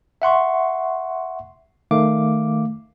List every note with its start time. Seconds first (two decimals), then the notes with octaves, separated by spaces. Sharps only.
0.22 E5 F#5 C6 C#6
1.91 D#3 A3 F5 D6